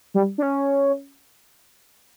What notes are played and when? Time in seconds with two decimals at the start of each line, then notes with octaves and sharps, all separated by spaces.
0.14 G3
0.38 D4
0.42 C#4